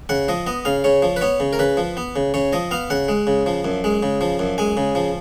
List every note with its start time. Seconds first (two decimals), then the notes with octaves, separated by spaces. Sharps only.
0.09 C#3 F#5
0.28 F3 D#5
0.47 B3 D#5
0.65 C#3 F5
0.84 C#3 C#5
1.02 F3
1.16 B4
1.21 B3 C#5
1.40 C#3
1.53 A#4
1.59 C#3 B4
1.77 F3
1.97 B3
2.16 C#3
2.34 C#3 C#5
2.53 F3 D#5
2.71 B3 F5
2.90 C#3 F#5
3.08 G#3
3.27 C#3
3.46 F3
3.65 F#2
3.84 G#3
4.03 C#3
4.21 F3
4.39 F#2
4.58 G#3 G#5
4.77 C#3
4.95 F3